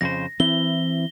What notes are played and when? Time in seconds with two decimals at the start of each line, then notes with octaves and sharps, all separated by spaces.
0.01 F2 C#3 C5 A#6
0.40 E3 C4 E4 G7